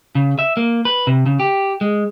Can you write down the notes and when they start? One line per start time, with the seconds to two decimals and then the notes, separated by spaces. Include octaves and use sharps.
0.15 C#3
0.39 E5
0.57 A#3
0.85 B4
1.07 C3
1.26 C#3
1.40 G4
1.81 G#3